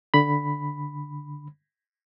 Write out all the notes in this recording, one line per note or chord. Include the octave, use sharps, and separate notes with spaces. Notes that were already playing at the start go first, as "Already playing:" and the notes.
D3 B5